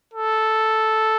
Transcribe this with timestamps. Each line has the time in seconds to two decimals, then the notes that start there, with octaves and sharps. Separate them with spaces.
0.14 A4